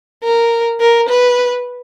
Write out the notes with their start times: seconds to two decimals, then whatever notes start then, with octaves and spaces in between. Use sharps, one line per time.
0.24 A#4
0.81 A#4
1.09 B4